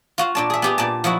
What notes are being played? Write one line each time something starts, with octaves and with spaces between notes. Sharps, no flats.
F4 F#4 F5
A#2 D4 A5
G#4 E5
B3 G4 G#4
A#2 D5 A5
F3 F#3 E4 F#4